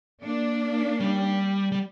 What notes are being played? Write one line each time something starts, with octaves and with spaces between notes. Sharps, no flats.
A#3 D4
G3
G3